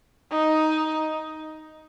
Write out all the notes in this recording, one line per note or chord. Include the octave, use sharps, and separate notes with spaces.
D#4